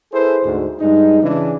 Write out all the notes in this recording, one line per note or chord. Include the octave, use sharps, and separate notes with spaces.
E4 G#4 A4 B4 C5
D2 G#2
G2 G#3 D#4
C#3 E3 D4